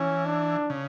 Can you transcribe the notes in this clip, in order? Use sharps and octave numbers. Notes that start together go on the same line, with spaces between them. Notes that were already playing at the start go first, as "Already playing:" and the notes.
Already playing: E3 C#4
D4
C#3